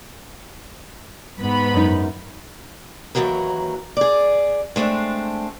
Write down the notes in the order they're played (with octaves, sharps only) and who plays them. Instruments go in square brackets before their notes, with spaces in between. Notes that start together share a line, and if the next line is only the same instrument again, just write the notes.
[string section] G#2 B3 B5
[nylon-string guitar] F#2 D#4
[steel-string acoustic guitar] D#2 A#2 E3 F#3 A#4
G#4 D5
G#3 A3 C4 D4